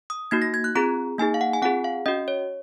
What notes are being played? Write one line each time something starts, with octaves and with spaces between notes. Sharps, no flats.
D#6
A#3 D#4 F#4 G#6
A#6
G#6
F#6
C4 F4 G#4 A#5
A#3 D#4 G#4 G#5
F5
F#5
G#5
C4 F4 G#4 F#5
F5
C#4 F#4 D#5
C#5